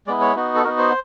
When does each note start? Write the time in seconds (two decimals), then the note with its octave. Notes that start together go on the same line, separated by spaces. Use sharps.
0.07 G#3 B3 E4 D5
0.21 C#5
0.36 B3 D#4 F#4
0.56 A4
0.64 B3 D#4 F#4 A#4
0.78 C5